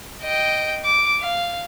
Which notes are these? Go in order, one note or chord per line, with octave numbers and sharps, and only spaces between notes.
D#5 G5
D6
F5